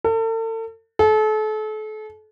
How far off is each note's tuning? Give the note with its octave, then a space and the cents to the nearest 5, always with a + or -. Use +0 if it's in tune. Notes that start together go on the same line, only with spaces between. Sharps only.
A4 +40
A4 -35